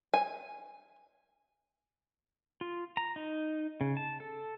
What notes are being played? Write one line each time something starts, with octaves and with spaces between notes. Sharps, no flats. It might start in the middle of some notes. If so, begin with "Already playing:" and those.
G#5
F4
A#5
D#4
C#3
A5
A4